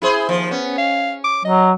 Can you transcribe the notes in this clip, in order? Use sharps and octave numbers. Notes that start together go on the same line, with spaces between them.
E4 G#4 C5
D#2 F3
B3 C#4
F5
D6
F#3 D#5